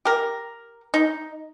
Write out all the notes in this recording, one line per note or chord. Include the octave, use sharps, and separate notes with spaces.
G4 A#4
D#4